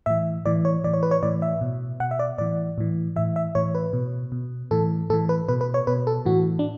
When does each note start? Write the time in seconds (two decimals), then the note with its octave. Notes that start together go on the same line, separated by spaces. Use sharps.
0.06 A2 E3 E5
0.46 A2 E3 D5
0.65 C#5
0.84 A2 E3 D5
0.93 C#5
1.03 B4
1.11 C#5
1.23 A2 E3 D5
1.42 E5
1.61 B2
2.00 B2 F#5
2.11 E5
2.19 D5
2.38 A2 E3 D5
2.78 A2 E3
3.16 A2 E3 E5
3.36 E5
3.55 A2 E3 C#5
3.75 B4
3.93 B2
4.32 B2
4.71 A2 E3 A4
5.10 A2 A4
5.13 E3
5.29 B4
5.49 B2 B4
5.61 B4
5.74 C#5
5.87 B2 B4
6.07 A4
6.26 A2 E3 F#4
6.59 D4